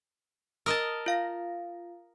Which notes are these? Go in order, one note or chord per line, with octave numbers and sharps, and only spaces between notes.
A#4 D#5 A5 D#6 E6
F4 F5 A#6